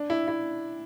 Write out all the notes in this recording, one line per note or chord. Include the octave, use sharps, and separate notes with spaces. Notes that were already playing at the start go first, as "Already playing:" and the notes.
Already playing: D4
E4
E4